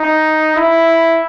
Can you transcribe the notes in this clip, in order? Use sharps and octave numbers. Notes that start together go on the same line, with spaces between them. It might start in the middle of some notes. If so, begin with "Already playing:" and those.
Already playing: D#4
E4